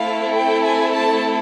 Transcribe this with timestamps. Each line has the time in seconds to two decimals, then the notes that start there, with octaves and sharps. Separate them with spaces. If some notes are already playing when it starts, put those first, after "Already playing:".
Already playing: A3 C4 E4 A4 F5
0.34 G5
0.63 G#5
0.93 A5